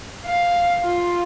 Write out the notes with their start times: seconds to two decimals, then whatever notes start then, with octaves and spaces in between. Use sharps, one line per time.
0.25 F5
0.82 F4